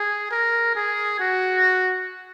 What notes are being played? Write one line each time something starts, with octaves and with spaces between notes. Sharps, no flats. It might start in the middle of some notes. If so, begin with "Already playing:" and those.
Already playing: G#4
A#4
G#4
F#4